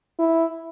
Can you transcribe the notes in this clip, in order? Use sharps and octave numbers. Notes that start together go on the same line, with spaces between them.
E4